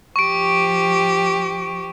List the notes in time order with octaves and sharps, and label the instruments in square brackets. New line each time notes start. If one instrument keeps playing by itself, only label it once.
[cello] F3 G4 [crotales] C#6 D7